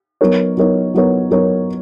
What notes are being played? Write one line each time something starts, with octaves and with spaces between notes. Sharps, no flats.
F#3 B3 D#4 A#4 C#5
F#3 B3 D#4 A#4 C#5
F#3 B3 D#4 A#4 C#5
F#3 B3 D#4 A#4 C#5